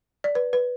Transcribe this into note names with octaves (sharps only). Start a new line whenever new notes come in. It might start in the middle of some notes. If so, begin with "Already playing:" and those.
D5
B4
B4